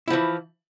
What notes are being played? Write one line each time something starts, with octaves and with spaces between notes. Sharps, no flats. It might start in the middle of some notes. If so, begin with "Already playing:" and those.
E3 F3 E4